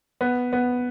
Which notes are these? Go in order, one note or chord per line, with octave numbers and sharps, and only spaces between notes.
B3
B3